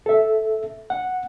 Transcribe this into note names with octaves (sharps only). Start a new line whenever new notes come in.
A4 E5
F#5